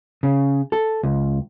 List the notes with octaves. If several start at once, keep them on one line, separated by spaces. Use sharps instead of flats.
C#3
A4
C#2